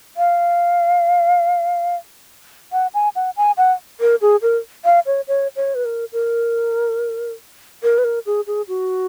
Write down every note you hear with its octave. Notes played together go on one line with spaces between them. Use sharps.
F5
F#5
G#5
F#5
G#5
F#5
A#4
G#4
A#4
F5
C#5
C#5
C#5
B4
A#4
A#4
A#4
B4
A#4
G#4
G#4
F#4